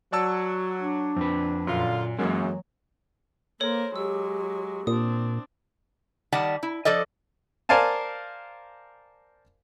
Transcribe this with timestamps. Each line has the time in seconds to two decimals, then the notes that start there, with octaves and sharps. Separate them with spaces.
0.13 F#3 D5 A5 E6
0.81 D4
1.16 F2 C4 B4
1.67 F#2 A#2 D3 F4
2.19 F#2 E3 F#3 G#3 A#3 C#4 A4 A#4
3.60 A#3 A4 A#4 C5 C#5
3.96 F#3 G#3 G4 E6
4.87 A#2 C4 D4 D#6
6.32 D#3 G3 D5 F#5 A5
6.63 E4
6.85 F3 A4 D5 D#5
7.69 A#4 C5 D5 F5 G#5 A5